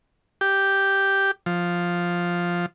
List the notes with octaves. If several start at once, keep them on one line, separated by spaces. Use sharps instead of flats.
G4
F3